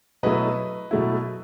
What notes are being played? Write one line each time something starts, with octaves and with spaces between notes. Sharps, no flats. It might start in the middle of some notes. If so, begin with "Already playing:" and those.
B2 F#3 A3 E4 B4 D#5
B2 F#3 A3 E4